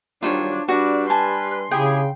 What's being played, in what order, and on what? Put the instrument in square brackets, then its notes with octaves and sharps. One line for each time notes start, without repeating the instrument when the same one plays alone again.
[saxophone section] D#3 F#3 G3 [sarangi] D4 [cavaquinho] F4 C5 C#5
[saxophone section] G3 B4 [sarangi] D4 [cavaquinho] F#4
[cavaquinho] G#5 A5 [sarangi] C6
[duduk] C#3 [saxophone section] E4 G4 G#4 [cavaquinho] G5